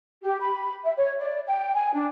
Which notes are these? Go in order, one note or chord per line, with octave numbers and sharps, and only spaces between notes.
G4
B5
E5
C#5
D5
G5
G#5
D4